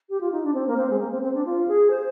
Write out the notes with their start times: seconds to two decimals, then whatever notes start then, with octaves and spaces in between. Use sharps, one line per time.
0.10 G4
0.21 F4
0.32 D#4
0.43 D4
0.54 C4
0.67 A#3
0.77 C4
0.90 G#3
0.99 A#3
1.11 C4
1.23 C4
1.34 D4
1.46 F4
1.68 G#4
1.90 C5